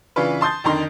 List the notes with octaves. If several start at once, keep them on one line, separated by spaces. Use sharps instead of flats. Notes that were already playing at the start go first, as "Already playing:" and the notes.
C#3 E3 D4 F4 B4
A5 C6 D#6 G6 A6
F2 D3 D#3 A#5 C6